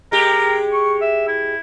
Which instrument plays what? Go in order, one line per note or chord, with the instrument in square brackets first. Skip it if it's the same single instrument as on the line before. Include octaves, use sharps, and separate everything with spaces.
[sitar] G#3 G4 [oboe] A#4
[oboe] C#6
E5
E4